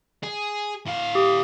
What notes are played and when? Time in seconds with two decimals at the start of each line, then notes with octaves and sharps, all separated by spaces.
0.23 G#4
0.86 A2 F5
1.15 G4 D#6